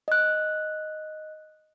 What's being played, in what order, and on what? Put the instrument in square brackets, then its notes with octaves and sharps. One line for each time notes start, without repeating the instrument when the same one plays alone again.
[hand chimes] D#5 F#6